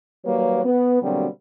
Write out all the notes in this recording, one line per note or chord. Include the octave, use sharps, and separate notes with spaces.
D#2 F#3 G3 A#3 B4 C#5
B3
B2 D3 F#3 G3 A#3 C4